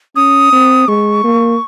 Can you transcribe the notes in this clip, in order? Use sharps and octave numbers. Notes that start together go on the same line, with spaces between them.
C#4 D#6
C4
G#3 C#6
A#3